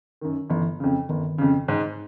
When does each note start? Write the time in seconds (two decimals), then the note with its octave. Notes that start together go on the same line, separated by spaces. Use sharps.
0.21 F#2 D#3
0.50 G1 E3
0.80 F2 C#3
1.09 G1 D#3
1.38 F2 C#3
1.68 G#2